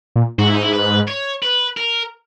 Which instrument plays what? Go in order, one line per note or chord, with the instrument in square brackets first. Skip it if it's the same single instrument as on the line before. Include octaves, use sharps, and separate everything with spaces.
[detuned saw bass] A#2
[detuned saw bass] G#2 [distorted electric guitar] F#4
[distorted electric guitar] E4
D#4
E4
B4
C#5
B4
A#4